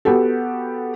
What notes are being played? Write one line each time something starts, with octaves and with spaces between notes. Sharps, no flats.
B3 F#4 G4 A4